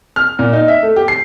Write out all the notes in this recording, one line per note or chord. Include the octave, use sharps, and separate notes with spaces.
F6
A#2
D#4
E5
A3
G4
C7